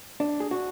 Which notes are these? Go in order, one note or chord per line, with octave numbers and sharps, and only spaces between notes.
D4
G#4
F#4